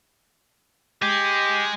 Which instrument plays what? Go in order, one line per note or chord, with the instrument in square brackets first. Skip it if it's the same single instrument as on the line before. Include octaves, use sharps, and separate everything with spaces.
[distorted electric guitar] G#3 [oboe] G4